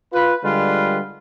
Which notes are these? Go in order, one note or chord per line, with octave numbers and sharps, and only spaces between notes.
F4 B4
D3 G3 G#3 F4 B4